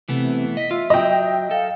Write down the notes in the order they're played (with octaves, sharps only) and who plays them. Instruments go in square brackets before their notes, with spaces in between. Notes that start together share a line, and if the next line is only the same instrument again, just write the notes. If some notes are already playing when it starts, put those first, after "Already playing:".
[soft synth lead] C3 [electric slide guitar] E3 A3 B3
[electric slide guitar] D#5 [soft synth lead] B6
[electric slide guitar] F4 [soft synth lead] E5
[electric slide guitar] F#3 [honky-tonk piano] D#5 G5
[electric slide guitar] A4 [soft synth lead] F5